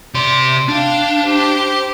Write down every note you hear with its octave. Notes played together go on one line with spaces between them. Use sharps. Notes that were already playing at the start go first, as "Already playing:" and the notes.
C3 D5 C6
D4 F5 G5
G4 C5